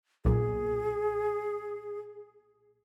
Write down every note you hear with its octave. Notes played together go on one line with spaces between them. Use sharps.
B1 A#2 G#4